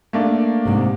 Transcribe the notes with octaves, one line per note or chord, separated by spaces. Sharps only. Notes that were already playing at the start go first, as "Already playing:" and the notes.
A3 A#3 D4
G#2 C3